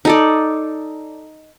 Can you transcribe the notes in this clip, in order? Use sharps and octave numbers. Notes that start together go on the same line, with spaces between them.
D#4 A4 D5